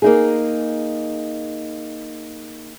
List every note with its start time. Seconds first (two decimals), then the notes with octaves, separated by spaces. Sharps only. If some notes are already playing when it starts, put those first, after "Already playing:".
0.02 A#3 D#4 G#4